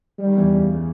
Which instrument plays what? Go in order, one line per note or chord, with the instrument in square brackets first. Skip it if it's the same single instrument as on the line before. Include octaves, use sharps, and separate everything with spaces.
[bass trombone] G3
[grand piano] D#3
E2 E3
C#2 C#3
C#3